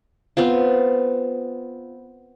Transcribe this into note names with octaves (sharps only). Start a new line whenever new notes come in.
B3 C4 F4